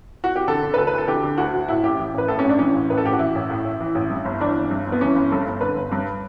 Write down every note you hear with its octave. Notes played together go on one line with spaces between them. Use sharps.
F#4
G4
D3 A4
D3
B4
D2 A4
B4
D2 A4
D3 G4
D3
D2 F#4
D2
A2 E4
A1 G4
E3
A1 B4
A2 A4
C#4
A1
D4
E3 C#4
A1
A2 B4
A4
A1 G4
F#4
E3 E4
A1
A2
A1
E3
A1
G2
G1
E3 D4
G1
G2
G1
B3
E3 C#4
G1
G2 A4
G1
D3 B4
G1
G2